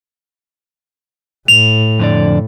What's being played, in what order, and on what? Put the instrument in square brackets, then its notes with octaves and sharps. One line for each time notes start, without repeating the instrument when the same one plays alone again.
[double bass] A2 [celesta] F7
[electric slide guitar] F2 D3 D5